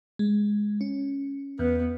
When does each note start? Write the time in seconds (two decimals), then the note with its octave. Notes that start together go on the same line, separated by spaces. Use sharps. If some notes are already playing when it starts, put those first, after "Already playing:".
0.19 G#3
0.81 C#4
1.59 E2 B3